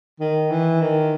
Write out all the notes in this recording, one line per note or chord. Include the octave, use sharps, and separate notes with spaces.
D#3
E3
D#3